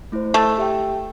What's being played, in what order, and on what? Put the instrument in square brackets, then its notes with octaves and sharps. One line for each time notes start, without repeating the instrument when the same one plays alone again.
[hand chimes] A3 E4 C5
[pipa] A3
[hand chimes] G4 E5 G5